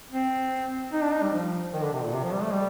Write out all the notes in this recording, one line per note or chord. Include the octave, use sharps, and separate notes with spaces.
C4
D#4
D4
D#4
G3
F3
D#3
D3
C3
A#2
C3
F3
G3
A3
G3